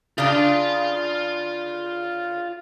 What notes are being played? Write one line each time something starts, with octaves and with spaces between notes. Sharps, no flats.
C#3 D4 F4 F5